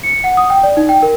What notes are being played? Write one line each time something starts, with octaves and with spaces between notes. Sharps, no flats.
C#7
F#5
D#6
G5
D5
D#4
G5
A#4